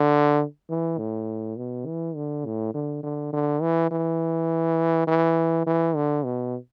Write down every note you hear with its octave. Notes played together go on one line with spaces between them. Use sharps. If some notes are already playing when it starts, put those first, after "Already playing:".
Already playing: D3
E3
A2
B2
E3
D3
A2
D3
D3
D3
E3
E3
E3
E3
D3
B2